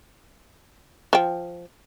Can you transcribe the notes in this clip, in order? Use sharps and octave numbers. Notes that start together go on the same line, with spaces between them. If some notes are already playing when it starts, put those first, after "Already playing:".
F3 G5